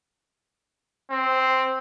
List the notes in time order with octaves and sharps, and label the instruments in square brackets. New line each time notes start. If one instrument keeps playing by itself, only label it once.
[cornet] C4